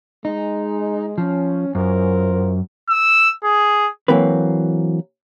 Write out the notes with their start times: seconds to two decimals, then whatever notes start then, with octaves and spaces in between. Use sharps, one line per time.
0.25 G#3 D#4
1.18 F3 C#4
1.75 F#2 F4 A#4 C5
2.90 E6
3.45 G#4
4.08 E3 F#3 A#3 C4 B4